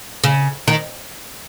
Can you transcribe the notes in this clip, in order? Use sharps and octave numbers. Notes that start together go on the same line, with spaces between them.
C#3
D#3